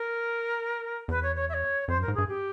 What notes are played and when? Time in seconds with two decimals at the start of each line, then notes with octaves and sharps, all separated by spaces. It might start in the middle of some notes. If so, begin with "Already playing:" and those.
Already playing: A#4
1.08 E2 B4
1.22 C#5
1.35 C#5
1.48 E5
1.53 C#5
1.88 F2 C5
1.97 F#2
2.01 A#4
2.08 G#2
2.14 G2 G#4
2.27 G4